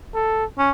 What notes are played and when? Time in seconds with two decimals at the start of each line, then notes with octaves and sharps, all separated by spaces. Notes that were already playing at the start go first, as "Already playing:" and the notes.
0.14 A4
0.58 C#4